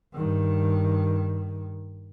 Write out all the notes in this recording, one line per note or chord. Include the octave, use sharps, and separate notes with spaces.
G2 D#3